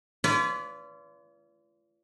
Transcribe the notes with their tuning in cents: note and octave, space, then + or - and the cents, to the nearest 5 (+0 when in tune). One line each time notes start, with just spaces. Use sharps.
F4 -40 B4 +0 D5 -35